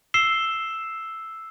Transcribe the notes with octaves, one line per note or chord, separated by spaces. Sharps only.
E6 C7 E7 G7